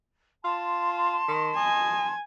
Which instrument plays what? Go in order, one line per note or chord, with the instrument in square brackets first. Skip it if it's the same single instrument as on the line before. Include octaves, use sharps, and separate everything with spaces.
[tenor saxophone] F4 [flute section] A5 C6
[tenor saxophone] D#3
[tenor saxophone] D#5 [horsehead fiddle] G#5